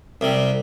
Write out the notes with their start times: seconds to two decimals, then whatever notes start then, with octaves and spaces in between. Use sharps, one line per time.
0.21 C2 C3 G3